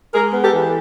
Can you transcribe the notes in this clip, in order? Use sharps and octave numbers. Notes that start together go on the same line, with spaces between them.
G#3 G#4 A#4
B3
G4 A4
E3